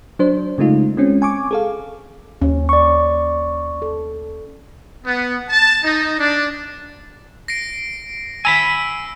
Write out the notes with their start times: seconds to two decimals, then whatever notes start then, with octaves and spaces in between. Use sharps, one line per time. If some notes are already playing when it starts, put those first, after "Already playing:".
0.19 F#3 D4 C5
0.58 C#3 G#3 A3 D#4 F4
0.97 G#3 C4 C#4
1.22 G#5 C#6 D6
1.51 G#4 A4 F5
2.41 D#2 C#4
2.69 D5 C#6
3.82 A4
5.05 B3
5.49 A5
5.84 D#4
6.19 D4
7.48 A#6 C7 D7
8.45 G#5 A#5 B5 E6